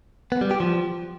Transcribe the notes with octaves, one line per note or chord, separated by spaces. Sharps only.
B3
G3
G4
F3